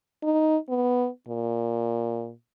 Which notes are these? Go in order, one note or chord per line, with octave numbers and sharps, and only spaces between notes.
D#4
B3
A#2